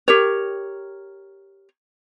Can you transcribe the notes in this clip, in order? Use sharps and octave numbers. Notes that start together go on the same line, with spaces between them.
G4 A#4 C#5